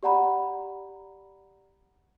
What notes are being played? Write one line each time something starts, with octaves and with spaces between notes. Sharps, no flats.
G4 D5 F#5 A#5 B5